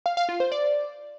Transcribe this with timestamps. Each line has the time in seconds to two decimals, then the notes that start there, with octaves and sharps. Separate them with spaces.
0.06 F5
0.17 F5
0.29 F4
0.40 C5
0.52 D5